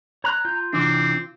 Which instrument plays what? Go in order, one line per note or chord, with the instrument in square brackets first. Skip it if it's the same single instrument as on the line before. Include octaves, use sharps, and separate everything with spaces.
[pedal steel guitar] C#5 F#6 [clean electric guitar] A#5
[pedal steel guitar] F4 G6
[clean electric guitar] C3 E3 D4 [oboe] C4